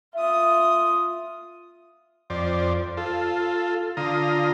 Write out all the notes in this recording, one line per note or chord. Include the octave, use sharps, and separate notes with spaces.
F4 E5 D#6
F2 C5 D5
F4 A4
D3 F4 A#5 D#6